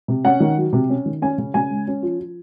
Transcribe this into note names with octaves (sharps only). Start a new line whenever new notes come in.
C3
C#4 F#5
D#3
F#3
C3
C#4
D#3
C#4 G#5
C#3
C#3 G#5
G#3
C#4
F3
F3